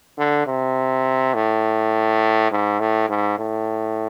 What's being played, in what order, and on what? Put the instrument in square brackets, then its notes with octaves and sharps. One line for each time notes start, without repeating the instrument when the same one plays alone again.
[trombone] D3
C3
A2
G#2
A2
G#2
A2